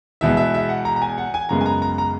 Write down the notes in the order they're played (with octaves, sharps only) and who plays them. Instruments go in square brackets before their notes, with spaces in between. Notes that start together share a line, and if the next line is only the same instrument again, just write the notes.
[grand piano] E2 B2 G#3 B3 E5
E5
E5
F#5
A#5
A#5
G#5
F#5
G#5
F#2 C#3 G#3 B3 A#5
G#5
A#5
A#5
A#5